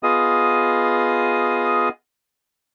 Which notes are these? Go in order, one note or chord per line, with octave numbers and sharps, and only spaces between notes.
B3 F4 G#4 D#5 D#6